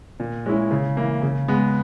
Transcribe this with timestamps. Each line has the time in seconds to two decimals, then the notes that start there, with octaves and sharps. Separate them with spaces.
0.20 A#2
0.46 G#3 C#4 E4
0.71 C#3
0.97 E3 A#3 E4
1.23 C#3
1.48 G#3 B3